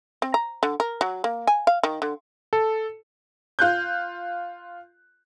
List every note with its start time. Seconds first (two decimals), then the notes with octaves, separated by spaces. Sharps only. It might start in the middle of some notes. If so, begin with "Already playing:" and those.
0.22 C4
0.34 A#5
0.63 D3
0.80 A#4
1.01 F#3
1.24 A#3
1.47 G#5
1.67 F5
1.83 D#3
2.02 D3
2.53 A4
3.59 F4 F#6 G6